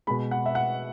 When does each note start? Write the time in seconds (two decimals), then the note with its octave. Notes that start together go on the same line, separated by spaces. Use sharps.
0.07 B2 G#3 B5
0.31 F#5
0.46 E5
0.55 F#5